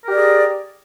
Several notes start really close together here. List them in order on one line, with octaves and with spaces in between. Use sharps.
A#4 G4 D5 G#4